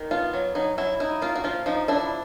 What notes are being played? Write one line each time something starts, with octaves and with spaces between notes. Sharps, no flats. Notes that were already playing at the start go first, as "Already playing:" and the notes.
Already playing: D#3
B3 F4
F#3
F#3 D#4
F#3 E4
D#4 E4
A#3 F4
F#4
F3 F4
F3 D#4
D4 E4